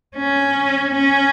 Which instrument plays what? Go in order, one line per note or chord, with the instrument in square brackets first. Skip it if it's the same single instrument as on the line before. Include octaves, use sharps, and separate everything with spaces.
[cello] C#4
C#4